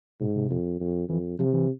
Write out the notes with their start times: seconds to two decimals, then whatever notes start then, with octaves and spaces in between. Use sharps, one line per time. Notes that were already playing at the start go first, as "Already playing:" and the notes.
0.20 G#2 B2
0.36 C3
0.51 F2
0.80 F2
1.09 F2 E3
1.39 C3 F3
1.53 E3